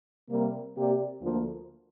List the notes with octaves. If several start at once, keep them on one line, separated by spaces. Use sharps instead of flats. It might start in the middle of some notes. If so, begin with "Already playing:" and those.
C3 G3 A#3
C3 A#3 G4 D5
D2 D3 F3 A#3 F4